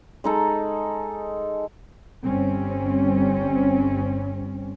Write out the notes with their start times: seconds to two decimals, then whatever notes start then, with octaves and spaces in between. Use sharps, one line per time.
0.24 G#3 D#4 A4
2.24 G1 G3 C4 C#4